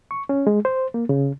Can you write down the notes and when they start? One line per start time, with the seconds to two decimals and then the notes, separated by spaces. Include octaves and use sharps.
0.11 C#6
0.29 C#4
0.47 G#3
0.65 C5
0.94 A#3
1.09 C#3